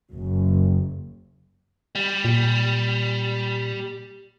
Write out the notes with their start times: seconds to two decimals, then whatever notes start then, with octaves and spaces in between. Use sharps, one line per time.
0.13 F#1
1.95 G3
2.24 A#2